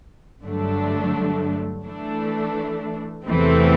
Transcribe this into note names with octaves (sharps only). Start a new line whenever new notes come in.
G2 D3 F#3 A3 D4
E3 A3 D4
E2 C3 E3 A3 C4